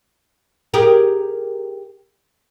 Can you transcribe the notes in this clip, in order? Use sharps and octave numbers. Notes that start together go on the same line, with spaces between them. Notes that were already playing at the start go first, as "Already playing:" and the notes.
G4 G#4 A#4